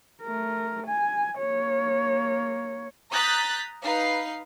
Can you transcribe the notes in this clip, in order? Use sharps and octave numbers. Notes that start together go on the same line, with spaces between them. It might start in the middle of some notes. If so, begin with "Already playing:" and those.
A3 A#4
G#5
A#3 C#5
A#5 D#6 F#6 G6 A6 B6
D#4 B4 F5 C7